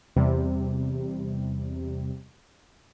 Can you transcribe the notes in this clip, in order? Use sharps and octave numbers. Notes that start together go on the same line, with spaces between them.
E2 C3 G3